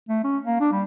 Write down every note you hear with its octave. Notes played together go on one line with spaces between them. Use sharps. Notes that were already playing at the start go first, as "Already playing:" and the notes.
A3
C#4
A#3
D4
G3